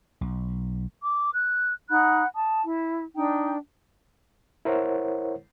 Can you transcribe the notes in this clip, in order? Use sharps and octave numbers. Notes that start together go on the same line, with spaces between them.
B1
D6
F#6
D#4 F#5 B5 F#6
A5 D#6
E4
D4 D#4 G5
E4 A#4 C5 C#5 F#5